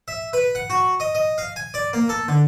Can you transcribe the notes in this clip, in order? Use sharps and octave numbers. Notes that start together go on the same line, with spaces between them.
E5
B4
F#5
F#4
D#5
D#5
F5
G#5
D5
A#3
A4
D3